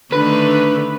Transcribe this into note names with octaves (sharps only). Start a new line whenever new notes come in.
D3 D#3 A3 B4